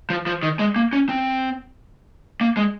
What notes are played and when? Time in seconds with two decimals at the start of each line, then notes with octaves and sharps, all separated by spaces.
0.10 F3
0.26 F3
0.43 D#3
0.59 G#3
0.76 A#3
0.93 C#4
1.09 C4
2.41 A#3
2.57 G#3